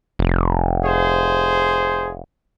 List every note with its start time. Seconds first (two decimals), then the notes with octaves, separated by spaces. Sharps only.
0.19 F1
0.85 G#4 C5